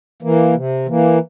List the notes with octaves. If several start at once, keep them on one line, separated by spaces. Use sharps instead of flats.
E3 A#3
C3
E3 A#3